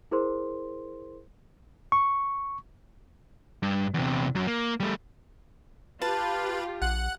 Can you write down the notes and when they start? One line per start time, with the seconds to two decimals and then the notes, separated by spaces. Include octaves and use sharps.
0.11 E4 G#4 A#4 C5 C6
1.92 C#6
3.63 G2
3.94 E2 C3
4.35 F#2 F#3
4.47 A#3
4.80 G3 A3
6.02 F4 G4 B4 A5
6.82 A#1 F#5 F#6